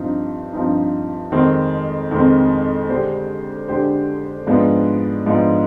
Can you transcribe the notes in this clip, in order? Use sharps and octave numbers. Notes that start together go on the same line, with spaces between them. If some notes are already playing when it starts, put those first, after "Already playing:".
Already playing: G2 F3 C4 D#4
G2 F3 C4 D#4
F2 D#3 G#3 C4
F2 D#3 G#3 C4
D3 G#3 D4 G4 C5
D3 G#3 D4 G4 C5
G#2 F3 G#3 B3 D4
G#2 F3 G#3 B3 D4